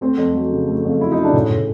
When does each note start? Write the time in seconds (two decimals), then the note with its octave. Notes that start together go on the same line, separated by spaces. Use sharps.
0.01 A3 C4
0.18 F2
0.34 F#3
0.51 C#3
0.68 A3
0.85 F2 F4
1.00 F#3 E4
1.12 D#4
1.17 C#3
1.23 D4
1.33 A2 C#4
1.50 A2